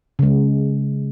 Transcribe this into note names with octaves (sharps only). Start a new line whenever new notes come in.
C#3 G#3